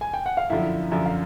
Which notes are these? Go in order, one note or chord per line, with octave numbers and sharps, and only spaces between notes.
G#5
G5
F#5
F5
F#2 D3 F3 E4 E5
F#2 D3 F3 E5
F5